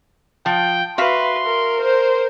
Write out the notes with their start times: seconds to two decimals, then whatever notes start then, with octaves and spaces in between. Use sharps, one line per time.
0.46 F3 G5
0.98 F#4 B4 E5 F5 C6
1.46 A#4
1.80 C5